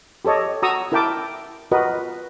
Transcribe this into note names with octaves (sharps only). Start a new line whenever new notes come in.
G4 A4 C#5 D#5
F#4 A#5 C#6 D#6 E6
E4 A#4 E5 G5 A5 D6
F4 F#4 A#4 B4 D#5